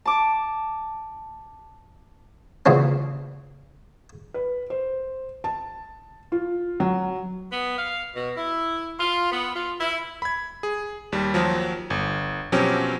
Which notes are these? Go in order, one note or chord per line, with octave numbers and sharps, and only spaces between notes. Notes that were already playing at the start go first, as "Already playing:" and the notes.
A5 D6
A#2 C#3 E3 B3 C4
B4
C5
A5
F4
F#3
B3
F5
B2
E4
F4
B3
F4
E4
B5 G#6
G#4
D#2 G3
D#2 F3 F#3
G1
B2 F3 F#3 C4 C#4 G4